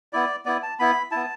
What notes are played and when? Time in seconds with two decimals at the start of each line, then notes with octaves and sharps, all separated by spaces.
0.13 B3 E4 D5
0.46 B3 E4 D5
0.63 A5
0.79 B3 E4 B5
1.11 B3 E4 A5